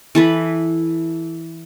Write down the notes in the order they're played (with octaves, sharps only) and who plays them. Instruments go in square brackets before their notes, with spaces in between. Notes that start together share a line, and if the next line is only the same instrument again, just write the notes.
[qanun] E3 A4 B4